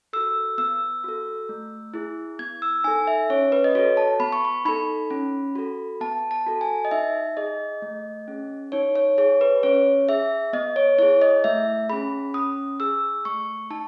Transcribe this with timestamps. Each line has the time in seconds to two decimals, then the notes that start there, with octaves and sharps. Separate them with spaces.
0.13 F#4 A4 E6
0.58 B3 E6
1.04 F#4 A4
1.49 A3
1.94 E4 G#4
2.39 B3 G#6
2.62 E6
2.84 D#4 A4 G#5
3.07 E5
3.30 C#4 C#5
3.52 B4
3.64 D#5
3.75 F#4 A4 C#5
3.97 A5
4.19 B3 B5
4.32 C#6
4.45 B5
4.65 D#4 A4 B5
5.10 C#4
5.56 F#4 A4
6.01 B3 A5
6.31 A5
6.46 F#4 A4
6.61 G#5
6.85 D#5
6.91 D#4 E5
7.37 G#4 D#5
7.82 A3
8.28 C#4 G#4
8.72 D#4 C#5
8.96 C#5
9.18 G#4 C#5
9.41 B4
9.63 C#4 C#5
10.08 G#4 E5
10.53 B3 D#5
10.76 C#5
10.98 E4 G#4 C#5
11.21 D#5
11.44 A3 E5
11.89 C#4 G#4 B5
12.34 C#4 D#6
12.80 G#4 E6
13.25 A3 C#6
13.70 D#4 A5